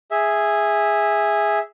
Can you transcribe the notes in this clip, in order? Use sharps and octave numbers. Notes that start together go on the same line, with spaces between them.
G#4 E5